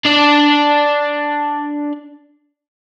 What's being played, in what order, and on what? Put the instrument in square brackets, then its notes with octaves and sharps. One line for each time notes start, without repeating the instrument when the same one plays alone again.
[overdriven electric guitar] D4 D5